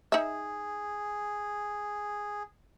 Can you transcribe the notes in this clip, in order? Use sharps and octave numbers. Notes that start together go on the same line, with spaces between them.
D#4 G#4 E5